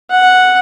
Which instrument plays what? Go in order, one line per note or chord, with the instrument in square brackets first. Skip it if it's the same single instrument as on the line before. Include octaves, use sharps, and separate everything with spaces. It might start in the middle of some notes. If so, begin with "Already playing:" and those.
[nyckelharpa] F#5